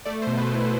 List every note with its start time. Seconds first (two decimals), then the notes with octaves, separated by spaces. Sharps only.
0.05 A3 D5
0.22 C5
0.27 B2
0.37 B4
0.49 A3 E4